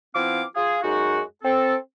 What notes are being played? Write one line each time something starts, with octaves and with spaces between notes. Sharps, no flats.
F3 B3 C4 E4 F5 D6
F4 G#4
F#2 G#3 D#4 F#4
C4 A4